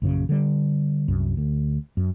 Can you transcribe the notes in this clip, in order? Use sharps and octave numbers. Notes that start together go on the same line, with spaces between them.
A#1 F#2 C#3
D3 G3
C2 F#2
D2
F#2